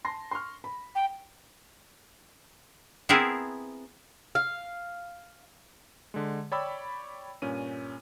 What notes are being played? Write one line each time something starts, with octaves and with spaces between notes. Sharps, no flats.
A5 C6 A#6
C6 C#6 F6
B5
G5
B3 C4 E4 G#4 A#4
F5
D3 G#3
C#5 D5 G5 B5 C#6 E6
G2 A#2 C#4 D#7